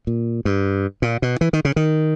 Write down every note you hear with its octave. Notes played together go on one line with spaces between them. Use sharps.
A#2
G2
A#2
B2
E3
D#3
C#3
D#3